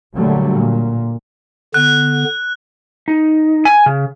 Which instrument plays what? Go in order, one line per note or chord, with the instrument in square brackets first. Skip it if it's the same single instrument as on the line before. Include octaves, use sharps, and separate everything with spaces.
[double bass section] A#2 D3 F#3 G3 A3
A#2
[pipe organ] D3 B3 [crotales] F#6
[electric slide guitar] D#4
G#5
C#3